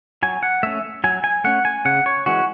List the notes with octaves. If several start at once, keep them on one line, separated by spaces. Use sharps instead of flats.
F#3 G#5
F#5
A3 C#4 E5
F#3 G#5
G#5
A3 C#4 F#5
G#5
C#3 F#5
C#5
E3 G#3 C#4 F#4